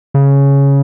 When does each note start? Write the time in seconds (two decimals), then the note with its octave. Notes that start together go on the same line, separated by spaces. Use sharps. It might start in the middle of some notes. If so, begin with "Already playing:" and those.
0.14 C#3